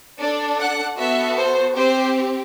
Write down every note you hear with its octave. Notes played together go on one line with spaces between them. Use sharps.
D4 A4 D5
F#5
B3 F#4 A4 E5
C5
C4 G4 C5